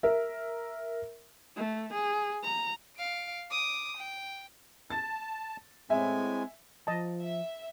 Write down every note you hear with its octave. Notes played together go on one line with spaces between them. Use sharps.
A#4 E5
A3
G#4
A#5
F5 D7
D6 D#6
G5
A5 A6
A2 G#3 C4 E5 G#5
F3 D#5 A5
E5